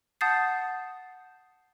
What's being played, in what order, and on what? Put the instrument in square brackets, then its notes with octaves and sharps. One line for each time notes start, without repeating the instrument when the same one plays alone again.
[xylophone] F#5 A5 D#6 G6 A6 C7